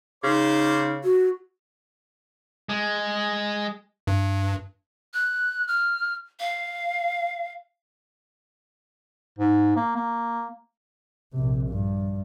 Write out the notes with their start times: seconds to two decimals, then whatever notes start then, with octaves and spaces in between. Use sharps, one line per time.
0.24 C#3 D#4 C5 D6
1.04 F#4
2.69 G#3
4.07 G2
5.14 F#6
5.68 F6
6.40 F5
9.38 G#2
9.76 A#3
9.96 A#3
11.33 A#1 C3
11.69 G2